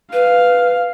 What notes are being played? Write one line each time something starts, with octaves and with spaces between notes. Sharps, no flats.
B4 F5